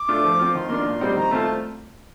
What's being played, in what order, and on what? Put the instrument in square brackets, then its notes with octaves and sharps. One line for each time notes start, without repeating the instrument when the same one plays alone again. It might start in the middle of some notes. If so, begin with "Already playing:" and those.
Already playing: [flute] D6
[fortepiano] A3 D4 F4
F3
C4 F4
[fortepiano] D#3 [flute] C6
[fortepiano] A#3 D4 F4
A#2
G3 C4 D#4
[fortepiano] D#3 [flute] A#5
[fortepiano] A3 C4 F4 [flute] A5